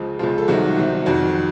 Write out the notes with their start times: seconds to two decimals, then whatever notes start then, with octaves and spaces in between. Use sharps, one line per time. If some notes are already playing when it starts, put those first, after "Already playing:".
Already playing: C#2 C#3 F3
0.19 C#2 C#3 F3 F4
0.38 A4
0.48 C2 C3 D#3 F#3 F#4
0.77 C2 C3 D#3
1.06 F2 D#3 F#3 F#4